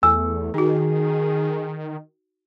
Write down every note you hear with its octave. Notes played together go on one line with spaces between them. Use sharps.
E2 A3 G#5 E6
D#3 D#4 F#4 G#4